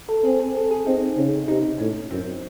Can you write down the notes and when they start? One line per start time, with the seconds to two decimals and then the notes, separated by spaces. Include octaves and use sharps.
0.09 A4
0.24 C4 G#4
0.40 G#4
0.55 A4
0.71 G#4
0.86 C4 D#4
1.17 C#3
1.48 C3 D#4
1.79 A2 C#4
2.11 F#2 C4